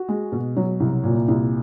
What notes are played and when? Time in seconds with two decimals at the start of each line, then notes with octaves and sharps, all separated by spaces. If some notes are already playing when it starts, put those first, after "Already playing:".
Already playing: F#4
0.08 G#3
0.32 B2
0.56 F#3
0.80 C2
1.03 A#2
1.28 C2